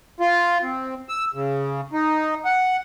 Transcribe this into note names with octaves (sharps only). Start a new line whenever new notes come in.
F4
C4
E6
C#3
D#4
F#5